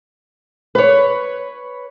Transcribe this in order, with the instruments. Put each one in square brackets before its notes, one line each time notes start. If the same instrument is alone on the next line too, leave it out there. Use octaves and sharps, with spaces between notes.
[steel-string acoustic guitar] B4 C#5